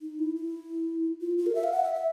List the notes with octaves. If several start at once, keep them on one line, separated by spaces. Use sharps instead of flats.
D#4
E4
E4
F4
F4
A#4
E5
F5
F#5
E5
E5